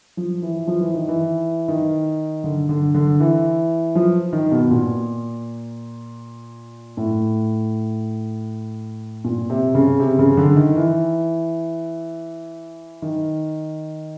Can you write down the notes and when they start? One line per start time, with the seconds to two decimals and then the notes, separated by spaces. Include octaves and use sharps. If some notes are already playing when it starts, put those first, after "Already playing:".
0.17 F3
0.42 E3
0.67 F3
0.81 E3
0.95 D#3
1.08 E3
1.68 D#3
2.44 D3
2.69 D3
2.94 D3
3.20 E3
3.95 F3
4.33 D#3
4.52 B2
4.71 A#2
6.97 A2
9.24 A#2
9.50 C3
9.75 C#3
10.00 C3
10.19 C#3
10.37 D3
10.56 D#3
10.76 E3
13.02 D#3